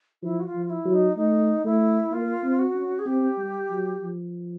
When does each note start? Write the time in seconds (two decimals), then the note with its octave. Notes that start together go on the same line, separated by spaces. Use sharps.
0.22 F3 E4
0.40 F#4
0.46 F4
0.55 F3
0.66 F4
0.70 E4
0.86 F#3
0.94 D#4
1.17 A3 D#4
1.65 A3 E4
2.12 A#3 F4
2.43 C4
2.59 F#4
2.75 C#4
2.99 G#4
3.06 C4 G4
3.38 G3
3.70 F#3
4.02 F3